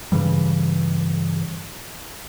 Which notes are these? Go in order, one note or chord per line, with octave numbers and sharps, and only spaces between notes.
G2 C#3 E3 G3